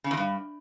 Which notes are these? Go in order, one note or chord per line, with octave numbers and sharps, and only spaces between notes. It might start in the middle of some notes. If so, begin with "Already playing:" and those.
C#3
E2
G2